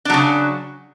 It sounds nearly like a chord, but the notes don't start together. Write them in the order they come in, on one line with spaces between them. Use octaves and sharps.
D4 F#3 C#3